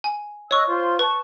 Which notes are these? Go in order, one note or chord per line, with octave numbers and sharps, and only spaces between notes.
G#5
C#5 D#5 C#6 E6 F#6
F4 C5 C6
B4 A5 C#6